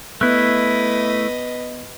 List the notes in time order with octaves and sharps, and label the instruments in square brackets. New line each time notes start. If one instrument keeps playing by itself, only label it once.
[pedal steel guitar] A3 E4 [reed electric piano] B3 F#6 [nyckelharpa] B4 D#5